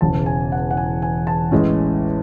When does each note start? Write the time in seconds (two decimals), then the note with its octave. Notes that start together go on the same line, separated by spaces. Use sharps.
0.01 E1 E2 C#3 A5
0.26 G#5
0.52 F#5
0.71 F#5
0.77 G#5
1.02 G#5
1.27 A5
1.51 A1 A2 G#3 C#4